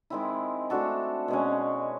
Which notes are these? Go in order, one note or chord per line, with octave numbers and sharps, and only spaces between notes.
D#3 G#3 C4 E4
A3 D4 F#4 A4
B2 G#3 C#4